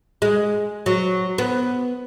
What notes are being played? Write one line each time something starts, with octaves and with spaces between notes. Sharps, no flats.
G#3
F#3
B3